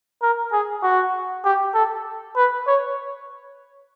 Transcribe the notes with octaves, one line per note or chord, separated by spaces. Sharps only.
A#4
G#4
F#4
G4
A4
B4
C#5